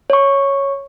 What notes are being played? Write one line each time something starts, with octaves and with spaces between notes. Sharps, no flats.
C#5 C#6